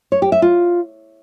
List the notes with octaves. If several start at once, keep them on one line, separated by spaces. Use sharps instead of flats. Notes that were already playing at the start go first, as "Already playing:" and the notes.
C#5
G4
E5
F4